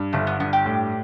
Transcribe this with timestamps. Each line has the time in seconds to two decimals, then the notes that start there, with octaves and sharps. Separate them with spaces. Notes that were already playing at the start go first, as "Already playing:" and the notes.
Already playing: G2
0.13 G1 A3
0.27 B3
0.40 G2 B3
0.53 G4
0.66 A2